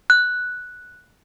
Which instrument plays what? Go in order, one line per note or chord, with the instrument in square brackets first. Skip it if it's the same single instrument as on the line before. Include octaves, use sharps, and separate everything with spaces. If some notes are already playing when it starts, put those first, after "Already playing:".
[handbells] F#6